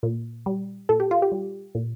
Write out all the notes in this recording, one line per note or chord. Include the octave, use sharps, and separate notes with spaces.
A#2
G3
A#2 A4
G4
F4
G4
G3
A#2